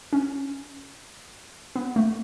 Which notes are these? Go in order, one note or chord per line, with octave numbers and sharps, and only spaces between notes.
C#4
B3
A3